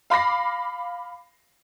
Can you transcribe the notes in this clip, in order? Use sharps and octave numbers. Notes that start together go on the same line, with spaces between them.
F5 B5 D6 A#6 C7